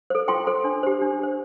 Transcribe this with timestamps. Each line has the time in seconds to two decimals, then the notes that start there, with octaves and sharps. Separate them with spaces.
0.10 A4 C5
0.28 F4 G5 C6
0.47 A4 C5
0.64 D4
0.83 G4 C5
1.02 D4
1.20 G4 C5